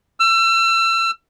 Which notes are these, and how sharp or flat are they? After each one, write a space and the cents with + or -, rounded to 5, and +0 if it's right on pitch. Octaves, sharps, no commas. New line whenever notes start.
E6 +35